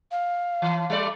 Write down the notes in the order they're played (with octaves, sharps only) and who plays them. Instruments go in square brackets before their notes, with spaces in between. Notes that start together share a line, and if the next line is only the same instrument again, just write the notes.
[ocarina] F5
[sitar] E3
G3 A3 D5